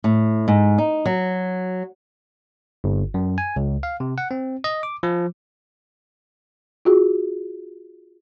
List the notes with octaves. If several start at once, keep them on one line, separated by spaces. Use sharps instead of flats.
A2
G#2
D#4
F#3
G1
F#2
G#5
C#2
F5
C3
F#5
C4
D#5
D6
F3
F4 F#4 G#4